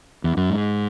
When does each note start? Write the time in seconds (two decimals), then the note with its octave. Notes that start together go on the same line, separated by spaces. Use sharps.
0.24 E2
0.37 F#2
0.50 G#2